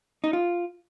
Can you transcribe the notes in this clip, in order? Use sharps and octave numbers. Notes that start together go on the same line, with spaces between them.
D#4
F4